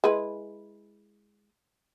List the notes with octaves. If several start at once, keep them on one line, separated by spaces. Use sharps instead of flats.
G#3 E4 B4